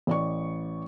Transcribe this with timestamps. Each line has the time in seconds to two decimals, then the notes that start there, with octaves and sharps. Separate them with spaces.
0.07 A1 D5 C#6